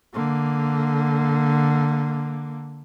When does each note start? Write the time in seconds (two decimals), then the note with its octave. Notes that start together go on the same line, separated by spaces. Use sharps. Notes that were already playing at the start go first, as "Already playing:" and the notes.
0.14 D3 A#3